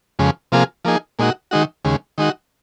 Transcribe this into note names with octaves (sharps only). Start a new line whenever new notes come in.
F2 C#3 G#3
C3 F3 A#3 F4 G#4
F3 A#3 D#4 G#4
A#2 G#3 D#4 F#4
D#3 G#3 D#4 F#4
D#2 C#3 G#3
D#3 G#3 D#4 F#4